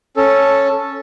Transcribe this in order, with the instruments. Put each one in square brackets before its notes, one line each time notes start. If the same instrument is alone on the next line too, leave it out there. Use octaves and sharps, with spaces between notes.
[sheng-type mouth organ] C#4 A4